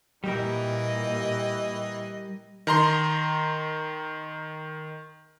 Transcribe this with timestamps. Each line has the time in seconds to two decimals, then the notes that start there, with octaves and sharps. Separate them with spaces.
0.24 A#2 E3 G3 G4 A#4 D#5
2.67 D#3 A#5 C6